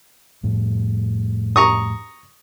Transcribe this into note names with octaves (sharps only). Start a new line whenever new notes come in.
F2 A2
A#5 C#6 D#6